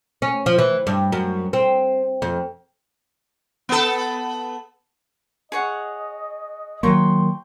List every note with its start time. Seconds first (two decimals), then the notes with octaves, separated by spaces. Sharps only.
0.22 C#4
0.46 F3
0.58 E3
0.87 G2
1.12 F#2
1.53 C4
2.22 F2
3.69 B3 A4
5.52 G#4 C#5 D#5 F#5
6.83 D#3 F#3 A#3 A#4 G5 C6 C#6